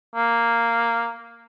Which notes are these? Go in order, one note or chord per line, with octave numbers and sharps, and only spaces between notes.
A#3